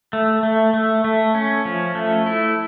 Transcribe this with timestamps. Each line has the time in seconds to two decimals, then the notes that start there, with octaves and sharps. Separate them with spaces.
0.13 A3
0.43 A3
0.74 A3
1.04 A3
1.35 C#4
1.65 F3
1.95 A3
2.26 E4